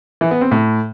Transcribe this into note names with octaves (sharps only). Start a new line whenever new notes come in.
E3
B3
C4
A2